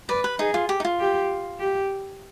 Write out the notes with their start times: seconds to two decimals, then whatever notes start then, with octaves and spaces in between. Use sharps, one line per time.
0.09 B4 D5
0.24 B4
0.39 D#4 G#4
0.54 F4
0.69 G4
0.80 D#4
0.85 F4
1.00 G4
1.60 G4